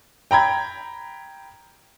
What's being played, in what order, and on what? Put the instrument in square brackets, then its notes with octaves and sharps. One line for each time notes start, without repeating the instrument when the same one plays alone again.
[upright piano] G5 A#5 B5 G#6